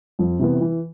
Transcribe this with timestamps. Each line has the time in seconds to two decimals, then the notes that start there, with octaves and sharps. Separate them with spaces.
0.19 F2
0.39 C3 E3 B3
0.61 E3